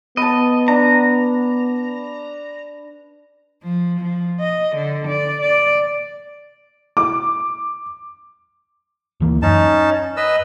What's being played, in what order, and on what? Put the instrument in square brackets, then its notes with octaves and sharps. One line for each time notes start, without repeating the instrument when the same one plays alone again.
[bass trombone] B3 [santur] B4 A5 [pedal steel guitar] D#5
[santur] D4 [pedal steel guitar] A#5
[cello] F3
F3
D#5
D3
D5
D5
[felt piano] D6
[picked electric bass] D2 E3 A#3
[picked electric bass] F#2 [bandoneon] C#4 D#4 A5
[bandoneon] B4 D#5 E6